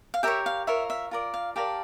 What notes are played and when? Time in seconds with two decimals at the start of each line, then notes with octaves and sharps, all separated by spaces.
0.14 F5
0.23 G4 A#4 C#5 E5
0.46 F5
0.67 F4 A#4 C#5 E5
0.90 E5
1.11 F4 A#4 D5
1.34 F5
1.56 G4 A#4 D5 F5 A5